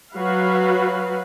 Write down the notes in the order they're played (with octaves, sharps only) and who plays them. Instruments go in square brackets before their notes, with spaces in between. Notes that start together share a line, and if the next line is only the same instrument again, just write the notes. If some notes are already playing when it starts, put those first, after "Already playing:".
[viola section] F#3 F#4 B4 F5